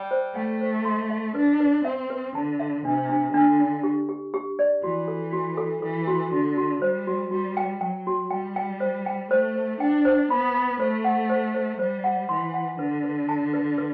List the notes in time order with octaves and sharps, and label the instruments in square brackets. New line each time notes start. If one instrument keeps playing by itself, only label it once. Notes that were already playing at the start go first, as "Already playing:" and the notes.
Already playing: [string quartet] G3
[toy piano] C5
[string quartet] A3 [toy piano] G5
[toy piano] C5
C6
E5
[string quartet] D4 [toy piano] B4
[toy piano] B4
[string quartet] C4 [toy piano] E5
[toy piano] B4
[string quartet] D3 [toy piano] A5
[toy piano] E5
[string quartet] C3 [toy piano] D4
[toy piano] D4
[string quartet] D3 [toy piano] D4
[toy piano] D4
G4
G4
G4
D5
[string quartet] E3 [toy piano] F#4
[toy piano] A4
F#4
A4
[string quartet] E3 [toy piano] A4
[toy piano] F#4
[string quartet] D3 [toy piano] F#4
[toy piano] F#4
[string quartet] G3 [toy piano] C5
[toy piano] F#4
[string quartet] G3 [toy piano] F#4
[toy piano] G5
[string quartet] F#3 [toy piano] G5
[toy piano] F#4
[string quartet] G3 [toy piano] G5
[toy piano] G5
C5
G5
[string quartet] A3 [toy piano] C5
[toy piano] C5
[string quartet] D4 [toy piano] G5
[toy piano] C5
[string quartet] B3 [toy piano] B5
[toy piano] B5
[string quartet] A3 [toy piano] C5
[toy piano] F#5
C5
C5
[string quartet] G3 [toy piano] C5
[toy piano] F#5
[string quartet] E3 [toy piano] C6
[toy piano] F#5
[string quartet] D3 [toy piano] B4
[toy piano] B4
A5
B4
B4